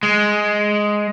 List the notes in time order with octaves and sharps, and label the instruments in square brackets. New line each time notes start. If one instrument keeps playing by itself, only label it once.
[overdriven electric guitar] G#3